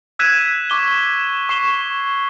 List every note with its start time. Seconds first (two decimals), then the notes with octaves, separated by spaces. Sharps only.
0.19 E6 F#6 G#6 B6 D#7 E7
0.70 C#6 D6 G7
1.49 C#6 C7 E7 G7